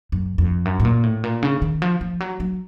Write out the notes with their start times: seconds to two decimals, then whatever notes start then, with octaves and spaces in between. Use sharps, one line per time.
0.12 F#2
0.38 F2
0.65 F#2
0.80 A2
0.85 A#2
1.03 A2
1.24 A#2
1.43 C#3
1.62 D#3
1.82 F3
2.01 F3
2.20 F#3
2.40 F#3